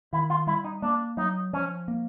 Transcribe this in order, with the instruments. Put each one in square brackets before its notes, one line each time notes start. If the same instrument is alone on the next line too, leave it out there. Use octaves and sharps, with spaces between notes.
[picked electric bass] D#3 [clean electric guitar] E4
[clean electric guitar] F4
[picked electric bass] G3 [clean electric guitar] E4
[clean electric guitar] D#4
[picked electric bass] A#3 [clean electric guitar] D4
[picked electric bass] F#3 [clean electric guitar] D#4
[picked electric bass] F3 [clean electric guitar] C#4
[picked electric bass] A#3